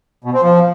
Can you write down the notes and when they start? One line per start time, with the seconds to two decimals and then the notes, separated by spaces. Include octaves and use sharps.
0.24 B2
0.33 C4
0.43 F3